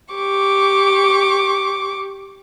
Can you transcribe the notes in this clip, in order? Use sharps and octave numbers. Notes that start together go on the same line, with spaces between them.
G4 C#6 D6